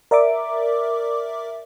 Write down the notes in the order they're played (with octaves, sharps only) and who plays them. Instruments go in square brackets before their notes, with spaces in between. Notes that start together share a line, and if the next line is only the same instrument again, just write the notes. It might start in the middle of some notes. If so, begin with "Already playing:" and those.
[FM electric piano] A#4 D5 E5 D6